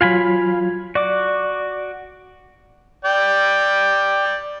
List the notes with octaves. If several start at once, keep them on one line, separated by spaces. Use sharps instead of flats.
F#3 F4 F5 G#5 B5
F#4 D5 D6
D5 G5